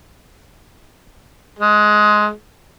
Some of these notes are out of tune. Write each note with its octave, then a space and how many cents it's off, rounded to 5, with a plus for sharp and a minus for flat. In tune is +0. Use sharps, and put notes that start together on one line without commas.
G#3 +15